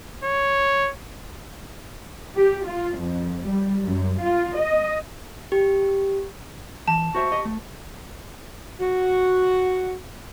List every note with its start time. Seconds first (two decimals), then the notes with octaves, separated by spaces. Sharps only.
0.24 C#5
2.35 G4
2.65 F4
2.98 F2
3.45 G3
3.83 F#2
4.20 F4
4.58 D#5
5.52 G4
6.88 E3 A5
7.15 F#4 C5 E5 C#6
7.32 G4 D#5
7.45 A3
8.80 F#4